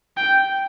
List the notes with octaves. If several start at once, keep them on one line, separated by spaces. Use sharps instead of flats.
G5